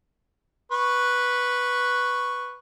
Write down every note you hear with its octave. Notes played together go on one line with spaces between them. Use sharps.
B4 C#6